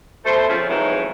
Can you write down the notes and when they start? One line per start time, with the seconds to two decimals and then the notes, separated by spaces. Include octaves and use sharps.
0.25 B2 A3 A4 C5
0.48 C#3 F3 A3 C4 C#4
0.68 F2 G#2 B2 D#3 E3 F#3